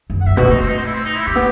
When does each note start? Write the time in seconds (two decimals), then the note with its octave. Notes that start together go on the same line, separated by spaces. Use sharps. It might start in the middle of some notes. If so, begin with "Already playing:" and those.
0.10 F#2
0.21 F#5
0.26 G2 E5
0.37 B2 F#4
0.49 A3 D#4
0.59 C4
0.68 D#4
0.77 C4
0.86 E4
0.94 C4
1.05 D#4
1.16 E4
1.27 A3 G4
1.36 B3